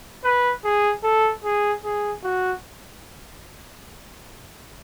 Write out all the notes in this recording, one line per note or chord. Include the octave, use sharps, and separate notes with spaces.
B4
G#4
A4
G#4
G#4
F#4